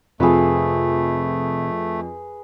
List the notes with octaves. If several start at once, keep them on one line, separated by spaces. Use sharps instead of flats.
F2 C3 A3 F4 G#4 A4 B4